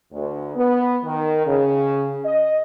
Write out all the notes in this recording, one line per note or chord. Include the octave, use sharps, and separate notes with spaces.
D2
B3
D#3
C#3
D#5